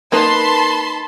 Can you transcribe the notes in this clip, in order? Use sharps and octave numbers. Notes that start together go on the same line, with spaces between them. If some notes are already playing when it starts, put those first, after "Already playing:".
A#3 D#4 B4 A5 B5 C6